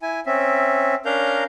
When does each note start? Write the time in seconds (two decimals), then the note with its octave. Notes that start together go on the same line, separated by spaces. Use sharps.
0.02 E4 G#5
0.26 C4 C#4 E5
1.05 C#4 D4 A#4 F5 A#5 G6